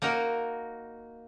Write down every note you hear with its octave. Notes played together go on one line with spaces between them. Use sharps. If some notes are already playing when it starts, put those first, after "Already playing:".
A#3 D#4 F#4 A#4